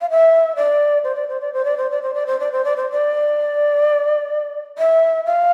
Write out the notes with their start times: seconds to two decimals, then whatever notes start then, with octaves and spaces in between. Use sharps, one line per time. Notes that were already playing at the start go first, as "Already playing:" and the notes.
0.01 F5
0.10 E5
0.56 D5
1.04 C5
1.15 D5
1.29 C5
1.41 D5
1.53 C5
1.65 D5
1.77 C5
1.91 D5
2.02 C5
2.14 D5
2.27 C5
2.40 D5
2.52 C5
2.64 D5
2.77 C5
2.91 D5
4.78 E5
5.25 F5